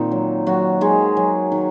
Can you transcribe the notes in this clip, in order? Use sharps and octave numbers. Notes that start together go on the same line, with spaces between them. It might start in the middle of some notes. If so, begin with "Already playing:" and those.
Already playing: A#2 D#3 C4 D#4
F#3
D#3 F#3 F#4
D#3 G#3 G#4
F#3
D#3